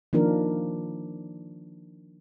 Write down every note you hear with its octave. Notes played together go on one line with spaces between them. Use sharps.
D#3 F3 A#3 D4 A#4